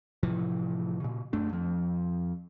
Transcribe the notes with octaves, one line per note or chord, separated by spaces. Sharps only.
A2 C3 E3 F3
A#2 C#3
F#2 A3 D4
F2 F3